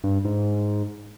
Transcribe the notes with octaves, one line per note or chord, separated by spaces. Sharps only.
G2
G#2